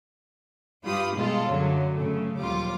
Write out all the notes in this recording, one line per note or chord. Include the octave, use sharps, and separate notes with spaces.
G2 F4 G4 B5 D#6
B2 G3 G#3 F4 A4
F#2 D3 F#3
F#2 C#3 A3
A#1 D#2 F#3 G3 F4 D6